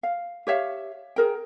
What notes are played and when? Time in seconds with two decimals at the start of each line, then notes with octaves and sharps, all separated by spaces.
0.03 F5
0.47 G4 C#5 E5 F5
1.16 G#4 A#4 G5